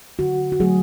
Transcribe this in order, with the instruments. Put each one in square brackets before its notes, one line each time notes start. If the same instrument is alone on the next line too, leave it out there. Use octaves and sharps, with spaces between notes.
[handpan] D3 F#4
F#4
F#3 A3 G#4